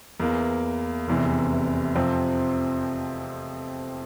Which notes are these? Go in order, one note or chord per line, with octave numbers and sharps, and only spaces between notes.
E2 E3 A#3
F1 E2 C3 E3
F2 C3 F3 C4